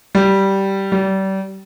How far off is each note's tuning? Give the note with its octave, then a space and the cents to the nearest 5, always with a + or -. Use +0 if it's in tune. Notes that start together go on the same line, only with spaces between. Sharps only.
G3 -10
G3 -30